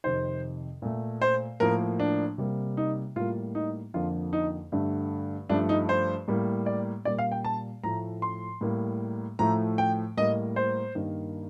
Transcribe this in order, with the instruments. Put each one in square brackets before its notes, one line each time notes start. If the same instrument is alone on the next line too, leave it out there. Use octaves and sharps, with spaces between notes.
[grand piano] F2 C3 D#3 C5
A#2 A3
C5
A2 F3 A#3 A#4
D4
C3 G3 A#3
D#4
A2 G3 A#3 F4
D#4
F2 D3 F3 A#3 F4
D#4
G2 D3 A3
G2 F3 A3 D4
D#4
C5
A2 G3 A#3
D5
A#2 G3 A#3 D5
F5
G5
A5
A2 F3 A3 A#5
C6
A2 G3 A#3
A2 F3 A3 A#5
G5
A2 G3 A#3 D#5
C5
G2 D#3 A#3